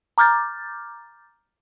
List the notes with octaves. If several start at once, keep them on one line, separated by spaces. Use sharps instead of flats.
A#5 D6 F6 G6 A6